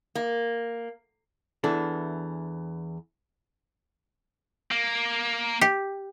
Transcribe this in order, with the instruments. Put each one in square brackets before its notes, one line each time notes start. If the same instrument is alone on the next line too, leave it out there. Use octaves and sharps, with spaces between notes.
[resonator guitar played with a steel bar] A#3
[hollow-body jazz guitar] E2 E3 D4 A4
[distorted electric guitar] A#3
[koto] G4